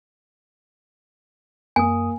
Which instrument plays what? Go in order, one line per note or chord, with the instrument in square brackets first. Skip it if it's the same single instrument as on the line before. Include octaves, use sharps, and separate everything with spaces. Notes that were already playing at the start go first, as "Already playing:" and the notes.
[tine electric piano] F#2 D#6 [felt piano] A#3 [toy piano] G#5